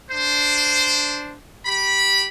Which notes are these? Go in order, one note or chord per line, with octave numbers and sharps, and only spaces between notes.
D4 C5
G4 B5